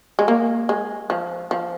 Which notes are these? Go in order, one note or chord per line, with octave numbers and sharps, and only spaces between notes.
G#3
A#3
G#3
F3
F3